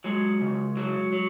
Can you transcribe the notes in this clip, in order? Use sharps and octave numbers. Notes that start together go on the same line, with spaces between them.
F#3 G#3
C#3
F#3
F#3